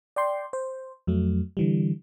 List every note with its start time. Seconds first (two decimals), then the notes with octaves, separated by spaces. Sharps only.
0.16 D5 G5 C6
0.53 C5
1.07 F2 F#3 A3
1.57 D3 E3 G3